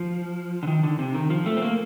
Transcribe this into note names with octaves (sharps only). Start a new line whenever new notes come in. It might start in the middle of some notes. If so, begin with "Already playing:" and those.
Already playing: F3
D3
D#3
D3
C3
D#3
F3
A3
C4
A#3